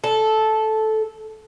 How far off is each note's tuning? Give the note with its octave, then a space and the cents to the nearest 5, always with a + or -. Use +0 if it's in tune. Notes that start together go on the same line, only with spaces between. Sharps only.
A4 -10